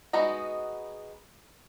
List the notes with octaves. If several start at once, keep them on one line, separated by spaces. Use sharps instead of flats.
G#3 B3 D#4 F#4